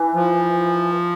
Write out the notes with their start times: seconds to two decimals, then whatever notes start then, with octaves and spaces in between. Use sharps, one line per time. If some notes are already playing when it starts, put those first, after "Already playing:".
Already playing: E3
0.14 F3